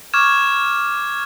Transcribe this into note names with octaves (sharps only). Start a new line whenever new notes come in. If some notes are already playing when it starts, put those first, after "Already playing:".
C#6 D6 F6 G#6 E7